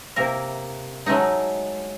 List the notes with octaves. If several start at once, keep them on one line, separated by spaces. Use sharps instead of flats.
C3 A#3 E4 A#4
F#3 G#3 A3 D#4